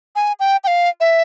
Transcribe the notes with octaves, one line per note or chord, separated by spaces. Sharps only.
G#5
G5
G5
F5
E5